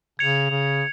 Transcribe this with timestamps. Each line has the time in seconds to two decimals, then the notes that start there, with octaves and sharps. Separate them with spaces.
0.19 C#3 G#6 C#7 F7
0.51 C#3